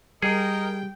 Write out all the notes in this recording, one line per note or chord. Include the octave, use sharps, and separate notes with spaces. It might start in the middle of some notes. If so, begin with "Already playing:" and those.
G3 G#4 A#4 D#5 G5